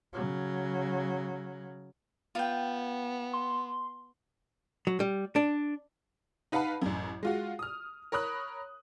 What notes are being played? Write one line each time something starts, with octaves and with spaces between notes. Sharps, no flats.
C#3 F#3
B3 F4 G5
C6
F#3
G3
D4
D#4 B4 F5 F#5 A5 B5
A1 F#2
G#3 F4 F#4
D#6 F6
A#4 C#5 B5 D#6 F#6